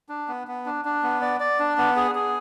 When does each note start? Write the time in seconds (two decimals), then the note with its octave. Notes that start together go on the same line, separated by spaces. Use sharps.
0.09 D4
0.28 B3
0.47 B3
0.66 D4
0.85 D4
1.03 B3
1.22 D5
1.40 D5
1.60 D4
1.78 B3
1.96 G#4
2.15 G#4